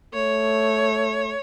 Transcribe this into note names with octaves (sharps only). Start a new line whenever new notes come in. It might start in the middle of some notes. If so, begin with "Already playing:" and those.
A3 C#5